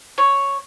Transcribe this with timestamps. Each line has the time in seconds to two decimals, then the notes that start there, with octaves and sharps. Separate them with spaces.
0.18 C#5